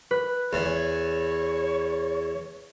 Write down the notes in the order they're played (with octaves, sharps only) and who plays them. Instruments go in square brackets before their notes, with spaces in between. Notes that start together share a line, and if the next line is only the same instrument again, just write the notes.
[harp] B4
[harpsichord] E2 [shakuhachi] C#5